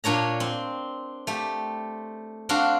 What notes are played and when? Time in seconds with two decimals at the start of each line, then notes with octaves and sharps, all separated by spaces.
0.04 A#2 D4 C#5 A#5
0.40 C4
1.27 A3 G4
2.49 C4 D4 F#4 F5